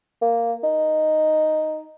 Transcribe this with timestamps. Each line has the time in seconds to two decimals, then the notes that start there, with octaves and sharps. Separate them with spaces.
0.22 A#3
0.64 D#4